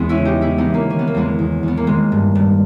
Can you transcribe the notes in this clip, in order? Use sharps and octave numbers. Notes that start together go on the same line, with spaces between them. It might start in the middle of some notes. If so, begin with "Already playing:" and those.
Already playing: E2 G#3 B3
C#4 E4
C#3
D#4 G4
C#3 C#4 E4
B3 D#4
E3
A#3 C#4
D#3 C#4
B3
A#3
E2 G#3 B3
E2
E2 B3
A#3
D#3 G#3
G2
G2